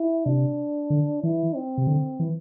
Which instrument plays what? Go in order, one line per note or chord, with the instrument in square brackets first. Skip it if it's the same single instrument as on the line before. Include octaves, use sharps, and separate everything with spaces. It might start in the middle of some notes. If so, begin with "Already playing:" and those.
Already playing: [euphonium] E4
[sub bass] C3 [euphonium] D4
[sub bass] D3
[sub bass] E3 [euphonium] E4
[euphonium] C4
[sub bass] C3
D3
E3